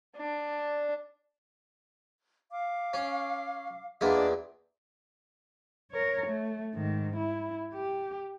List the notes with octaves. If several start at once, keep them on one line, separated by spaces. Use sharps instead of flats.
D4
F5 D6
C#4
E2 A#2 B3 D4 D#5
A#4 C#5
A3
G#2 D#3
E4
G4